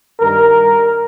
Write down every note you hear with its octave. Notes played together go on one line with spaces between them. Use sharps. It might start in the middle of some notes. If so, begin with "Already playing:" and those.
G2 D#3 G3 A#4